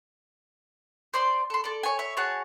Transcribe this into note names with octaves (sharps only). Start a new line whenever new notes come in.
C5 D5 C6
A4 C6
A4 D5
C#5 G#5
C#5 E5
F#4 G#4 C#5 A5